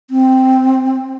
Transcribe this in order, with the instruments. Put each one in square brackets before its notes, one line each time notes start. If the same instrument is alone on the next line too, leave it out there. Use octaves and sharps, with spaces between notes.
[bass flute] C4